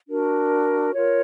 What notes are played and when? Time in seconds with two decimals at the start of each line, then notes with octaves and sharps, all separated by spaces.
0.08 D4 F#4 A#4
0.94 F4 A#4 C#5